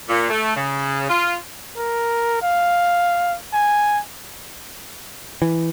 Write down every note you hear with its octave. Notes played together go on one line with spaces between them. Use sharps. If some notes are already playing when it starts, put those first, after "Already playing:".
A#2
A3
C#3
F4
A#4
F5
G#5
E3